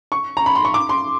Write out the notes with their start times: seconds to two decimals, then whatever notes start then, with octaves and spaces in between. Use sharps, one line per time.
0.12 C#6
0.37 A#5
0.46 B5
0.55 C6
0.65 C#6
0.74 D6
0.89 C6